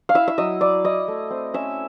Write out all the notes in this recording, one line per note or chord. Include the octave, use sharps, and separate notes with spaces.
F5
E4 E5
E5
F#3 D#5
E4 D5
E4 D#5
A3
C4
C#4 E5